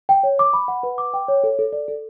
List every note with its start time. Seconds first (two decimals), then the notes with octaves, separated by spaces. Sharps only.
0.09 G5
0.23 C#5
0.39 D6
0.53 B5
0.68 F#5
0.83 B4
0.98 D6
1.14 G5
1.28 C#5
1.44 A4
1.59 A4
1.73 D5
1.88 A4